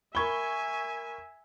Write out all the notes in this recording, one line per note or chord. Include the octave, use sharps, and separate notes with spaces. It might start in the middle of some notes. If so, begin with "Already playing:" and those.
A#4 E5 G#5 B5 C#6 G#6 G7